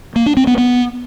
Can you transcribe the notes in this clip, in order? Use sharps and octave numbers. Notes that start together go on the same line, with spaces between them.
A#3
D4
C4
B3
B3